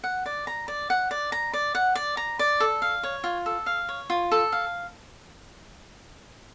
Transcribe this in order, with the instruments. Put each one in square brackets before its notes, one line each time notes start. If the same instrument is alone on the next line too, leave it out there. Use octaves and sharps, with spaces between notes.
[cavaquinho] F#5
D5
A#5
D5
F#5
D5
A#5
D5
F#5
D5
A#5
D5
A4
F5
C#5
F4
A4
F5
C#5
F4
A4
F5